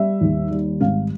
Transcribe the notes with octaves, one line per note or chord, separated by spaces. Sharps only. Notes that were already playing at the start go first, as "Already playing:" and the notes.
Already playing: G3 E5
D#2
G3
G#1 F5